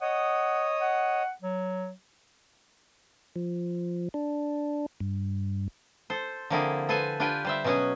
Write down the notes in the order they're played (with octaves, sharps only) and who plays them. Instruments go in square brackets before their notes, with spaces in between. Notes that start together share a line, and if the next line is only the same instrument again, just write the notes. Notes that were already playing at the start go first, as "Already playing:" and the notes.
[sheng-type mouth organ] C#5 D#5 D#6 [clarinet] F#5
[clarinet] F#5
F#3
[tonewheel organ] F3
D4
G2
[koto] A4 C5
D3 F3 A#3 C4 E4 G#4
A4 B4 C5 G#5 A5
D4 F4 G4 B4 G5 G#5
G3 C5 E5
B2 F#3 C#4 F#4 G#4